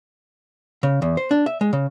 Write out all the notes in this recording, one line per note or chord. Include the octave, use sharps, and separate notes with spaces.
C#3
E2
C5
D4
E5
G#3
C#3